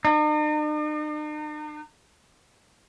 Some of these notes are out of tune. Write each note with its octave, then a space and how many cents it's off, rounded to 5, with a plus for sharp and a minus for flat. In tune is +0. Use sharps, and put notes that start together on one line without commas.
D#4 -45